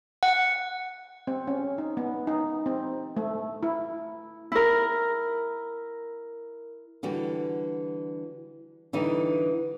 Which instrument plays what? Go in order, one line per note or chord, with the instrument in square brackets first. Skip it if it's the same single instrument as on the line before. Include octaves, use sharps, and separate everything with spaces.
[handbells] F#5
[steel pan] C4
C#4
D#4
B3
D#4
C4
A3
E4
[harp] E4 A#4
[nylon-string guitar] D3 E3 G3 F#4
D3 E3 G3 D#4